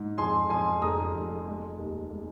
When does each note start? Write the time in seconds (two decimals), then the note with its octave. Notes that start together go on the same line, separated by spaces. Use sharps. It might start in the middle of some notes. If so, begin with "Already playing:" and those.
Already playing: G#2
0.18 F2 G#5 C6
0.49 F2 G#5 C6
0.82 F1 A#5 D#6
1.14 F1
1.46 G#3
1.78 D#2
2.11 G#3